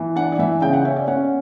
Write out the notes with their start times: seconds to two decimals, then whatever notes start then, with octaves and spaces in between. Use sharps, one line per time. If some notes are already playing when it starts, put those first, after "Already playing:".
Already playing: E3
0.16 D4 F#5
0.32 D5
0.39 E3 E5
0.62 C#3 G5
0.73 F#5
0.85 C#4 E5
0.96 D5
1.08 C#4 F#5